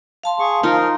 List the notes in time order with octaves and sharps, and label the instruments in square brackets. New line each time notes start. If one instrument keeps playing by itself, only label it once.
[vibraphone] F5 A5 C6
[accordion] G#4 C#6
[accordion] F3 A#4 [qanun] D#4 F4